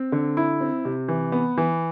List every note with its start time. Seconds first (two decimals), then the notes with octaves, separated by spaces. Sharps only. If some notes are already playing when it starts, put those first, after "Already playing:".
Already playing: C4
0.12 D3
0.37 E4
0.61 C4
0.85 C3
1.08 E3
1.32 B3
1.57 E3